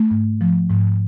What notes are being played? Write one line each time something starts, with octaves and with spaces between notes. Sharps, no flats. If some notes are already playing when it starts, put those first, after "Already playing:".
Already playing: A3
G#2
F3
G#2